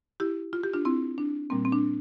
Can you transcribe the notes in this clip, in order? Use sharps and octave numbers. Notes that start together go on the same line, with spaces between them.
E4 G4
F4
G4
D4 F4
C4 E4
D4
A#2 G3 A#3 C4
C4
D4